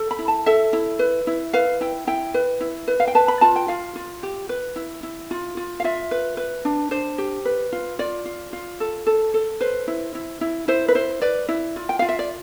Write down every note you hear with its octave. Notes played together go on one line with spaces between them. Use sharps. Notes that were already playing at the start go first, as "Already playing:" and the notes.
Already playing: A4
B5
E4
A5
A4 E5
E4
B4
E4
B4 F5
E4 G5
E4 G5
B4
E4
B4
F5
G5
B4 A5
B5
F4 A5
G5
F4 F5
F4
G4
B4
E4
E4
F4
F4
F5
F4 E5
B4
B4
D4
D4 C5
G4
B4
F4
F4 D5
F4
F4
A4
A4
A4
B4 C5
E4
E4
E4
E4 C5
B4
E4 C5
B4 D5
E4
F4
G5
F4 F5
E5
D5